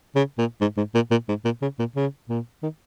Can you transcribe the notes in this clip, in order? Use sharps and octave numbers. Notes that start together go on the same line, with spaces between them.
C#3
A#2
G#2
G#2
A#2
A#2
G#2
A#2
C#3
A#2
C#3
A#2
D#3